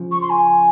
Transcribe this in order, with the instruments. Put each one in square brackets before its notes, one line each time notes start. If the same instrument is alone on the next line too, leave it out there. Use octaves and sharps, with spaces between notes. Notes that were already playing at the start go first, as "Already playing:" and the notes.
Already playing: [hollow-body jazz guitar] C#3 F3
[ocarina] C#6
C6
G#5